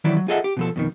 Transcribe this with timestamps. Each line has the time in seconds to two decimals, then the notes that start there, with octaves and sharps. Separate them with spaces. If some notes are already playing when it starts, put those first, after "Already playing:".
0.04 D#3 E3 F#3 E4 D5
0.17 F#3
0.28 F4 G#4 A4 D#5 E5 F#5
0.44 G4
0.57 B2 F3 A4
0.76 F2 B2 D#3